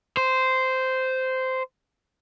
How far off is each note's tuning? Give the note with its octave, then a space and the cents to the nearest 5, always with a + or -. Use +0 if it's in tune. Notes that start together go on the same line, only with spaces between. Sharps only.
C5 -10